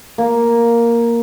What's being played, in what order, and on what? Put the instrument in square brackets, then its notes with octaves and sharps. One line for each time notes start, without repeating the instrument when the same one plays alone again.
[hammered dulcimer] A#3